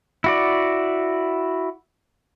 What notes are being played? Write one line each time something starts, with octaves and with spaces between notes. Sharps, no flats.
E4 F#4 D5